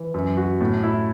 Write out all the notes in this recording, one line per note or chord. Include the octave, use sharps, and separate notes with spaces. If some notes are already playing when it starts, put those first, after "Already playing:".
Already playing: E3
F#2
F#4
A2
E4